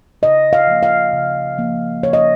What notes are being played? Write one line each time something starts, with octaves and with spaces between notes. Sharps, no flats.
C#3 D#5
F5
F3 A#3
F5
C#3
F3 A#3
C#3 C#5
D#5